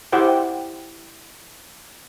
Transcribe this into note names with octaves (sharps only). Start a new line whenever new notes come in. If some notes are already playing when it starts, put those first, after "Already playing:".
E4 G4 C5 F#5 G5